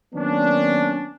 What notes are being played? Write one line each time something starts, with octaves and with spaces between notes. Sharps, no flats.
D#3 F#3 A#3 B3 C#4 D4